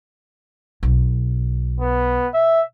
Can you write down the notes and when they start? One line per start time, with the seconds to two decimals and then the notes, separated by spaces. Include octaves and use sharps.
0.83 B1
1.80 B3
2.34 E5